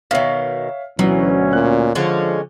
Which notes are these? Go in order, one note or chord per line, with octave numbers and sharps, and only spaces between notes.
B2 D#3 C#5 E5 F5
D2 B2 E3 F#3 C#4
A#2 F#6
D3 F3 G#3 C#4